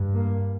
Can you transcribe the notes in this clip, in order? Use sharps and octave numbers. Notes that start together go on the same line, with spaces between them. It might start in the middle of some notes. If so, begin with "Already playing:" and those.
Already playing: G2
A#3